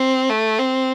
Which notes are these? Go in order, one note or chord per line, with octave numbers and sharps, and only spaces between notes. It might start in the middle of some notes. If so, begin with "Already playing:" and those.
Already playing: C4
A3
C4